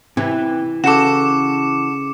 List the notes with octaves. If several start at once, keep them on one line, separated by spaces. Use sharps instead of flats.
C3 E3
C#3 F#4 A4 D6 C#7 E7